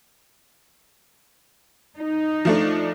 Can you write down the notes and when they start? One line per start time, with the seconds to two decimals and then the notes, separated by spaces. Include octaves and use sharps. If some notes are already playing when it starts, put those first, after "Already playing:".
1.96 D#4
2.45 F3 A3 D4